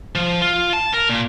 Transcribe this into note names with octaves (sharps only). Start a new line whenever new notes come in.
F3
F4
A5
A#4
A#2